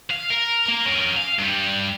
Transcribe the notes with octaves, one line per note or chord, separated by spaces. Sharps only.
F5
A#4
A#3 A#4
C#4 A#4
F5
G2 G3